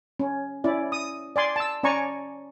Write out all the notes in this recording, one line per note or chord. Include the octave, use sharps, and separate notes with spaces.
C#4
C#4 E4 D5
D#6
D5 G#5 C6
A5 E6
C#4 D5 G#5 A#5 C#6